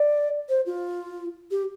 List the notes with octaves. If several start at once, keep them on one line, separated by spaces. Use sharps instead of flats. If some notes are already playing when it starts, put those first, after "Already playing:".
Already playing: D5
C5
F4
G4